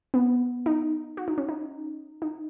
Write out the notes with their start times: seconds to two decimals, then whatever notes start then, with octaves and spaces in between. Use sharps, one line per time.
0.14 B3
0.66 D#4
1.17 F#4
1.28 D#4
1.38 C#4
1.49 D#4
2.22 D#4